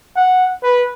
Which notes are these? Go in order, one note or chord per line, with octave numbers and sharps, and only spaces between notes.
F#5
B4